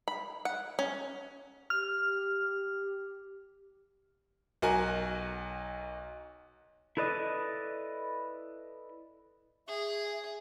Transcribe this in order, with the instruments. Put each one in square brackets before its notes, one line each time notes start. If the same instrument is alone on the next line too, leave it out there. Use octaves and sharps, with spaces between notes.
[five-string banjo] B5
F#5
C#4
[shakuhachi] G4 [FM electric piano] F6
[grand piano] B1 F#4 A#4 G#5
[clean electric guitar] E4 A4 B4 D5 D#5
[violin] G#4 [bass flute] E5